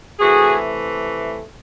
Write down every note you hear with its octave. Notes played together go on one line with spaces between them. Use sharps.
C3 E3 A3 F#4 G#4